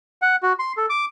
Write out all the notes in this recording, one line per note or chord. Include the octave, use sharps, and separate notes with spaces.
F#5
F#4
C6
A4
D6